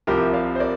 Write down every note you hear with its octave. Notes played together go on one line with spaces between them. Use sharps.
C2 C3 F3 G4 A#4
D5 F5
C5
A#4 D5